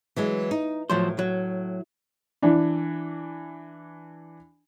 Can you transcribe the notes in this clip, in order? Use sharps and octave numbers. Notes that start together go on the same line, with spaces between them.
E3 F#3 G#3
D#4
A2 F3 F#3 C5
F#3
E3 D4